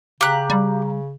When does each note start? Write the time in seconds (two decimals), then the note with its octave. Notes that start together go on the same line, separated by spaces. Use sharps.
0.21 C#3 G4 F5 A#5 F#6
0.50 G3